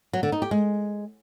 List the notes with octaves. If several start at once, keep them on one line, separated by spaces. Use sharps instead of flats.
F#3
D3
D#4
G4
G#3